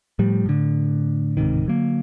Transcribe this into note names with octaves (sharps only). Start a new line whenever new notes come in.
A2 F3 G3
A2 D3
D1 G#2 C3 D#3
D3 F#3 A#3